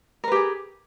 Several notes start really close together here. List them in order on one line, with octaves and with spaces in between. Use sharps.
A#4 B4 G4 G#4